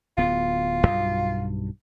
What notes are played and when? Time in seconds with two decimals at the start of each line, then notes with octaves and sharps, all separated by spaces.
0.18 D1 B3 F4
0.87 B1 G2